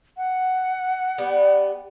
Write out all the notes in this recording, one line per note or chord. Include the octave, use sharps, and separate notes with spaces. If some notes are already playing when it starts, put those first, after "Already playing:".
F#5
G3 B3